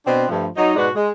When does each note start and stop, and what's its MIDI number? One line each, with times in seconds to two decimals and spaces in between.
0.06 0.25 47
0.06 0.25 60
0.06 0.25 62
0.06 0.25 71
0.06 0.25 72
0.29 0.47 43
0.29 0.47 53
0.29 0.47 57
0.56 0.74 54
0.56 0.74 63
0.76 0.88 44
0.76 0.88 47
0.76 0.88 56
0.76 0.88 66
0.76 0.88 71
0.76 0.88 74
0.95 1.09 56